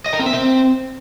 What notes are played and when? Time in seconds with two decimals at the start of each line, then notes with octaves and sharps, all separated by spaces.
0.06 D#5
0.13 A#4
0.20 C4
0.26 E5
0.33 C4